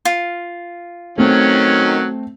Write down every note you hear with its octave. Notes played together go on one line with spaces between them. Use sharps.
F4
D#3 F#3 A3 C4 C#4